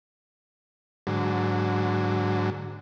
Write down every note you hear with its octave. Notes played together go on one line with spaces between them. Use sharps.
G#2 D3 F#3